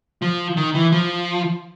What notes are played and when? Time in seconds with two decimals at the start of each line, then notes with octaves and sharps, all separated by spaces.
0.22 F3
0.57 D#3
0.74 E3
0.92 F3